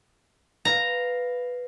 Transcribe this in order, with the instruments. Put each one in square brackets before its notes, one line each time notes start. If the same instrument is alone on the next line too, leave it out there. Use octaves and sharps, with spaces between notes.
[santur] B4 F5 [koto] A#5